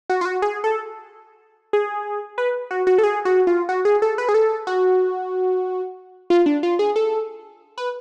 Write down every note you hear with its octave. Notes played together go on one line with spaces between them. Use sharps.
F#4
F4
F#4
G#4
A4
G#4
B4
F#4
F#4
A4
G#4
F#4
F4
F#4
G#4
A4
B4
G#4
A4
F#4
F4
D4
F4
G#4
A4
B4